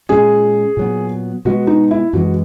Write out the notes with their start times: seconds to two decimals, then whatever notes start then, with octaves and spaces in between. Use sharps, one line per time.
0.09 A#2 G#3 C#4 G#4
0.77 A#2 F#3 B3
1.45 B2 G#3 B3 F#4
1.67 D#4
1.91 E4
2.13 F#2 E3 G#3 F#4